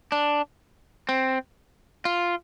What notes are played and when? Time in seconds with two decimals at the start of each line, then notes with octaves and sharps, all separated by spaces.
0.12 D4
1.09 C4
2.05 F4